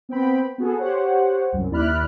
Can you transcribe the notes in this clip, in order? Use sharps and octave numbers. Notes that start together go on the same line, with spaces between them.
B3 C4 G5 B5
B3 F#4 G#4 A4
G4 C5 C#5 F#5
C2 F#2
D#2 E4 D5 B5 F6 F#6